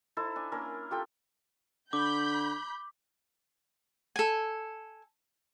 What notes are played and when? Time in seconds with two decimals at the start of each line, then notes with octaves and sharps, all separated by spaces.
0.17 D#4 E4 A4 C5
0.36 D4 G#5
0.52 A#3 C#4 D4 A#4
0.91 F4 G4 A4 G5
1.93 D3 B5 D6 G6
4.16 A4 G#5